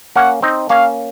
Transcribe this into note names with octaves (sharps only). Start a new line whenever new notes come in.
A#3 C#4 F#5
C4 D#4
A#3 C#4 F5